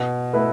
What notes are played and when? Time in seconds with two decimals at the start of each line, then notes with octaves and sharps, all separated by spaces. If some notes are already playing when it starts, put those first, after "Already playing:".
Already playing: B2
0.33 A3 E4 B4